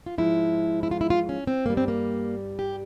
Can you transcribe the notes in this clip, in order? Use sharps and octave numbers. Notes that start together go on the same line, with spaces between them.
F4
G#2 F3 G#3 E4
E4
F4
E4
F4
C#4
C4
G2 G3 A#3
C4
A#3
G4